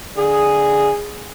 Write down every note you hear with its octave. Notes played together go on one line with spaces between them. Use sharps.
D3 G#4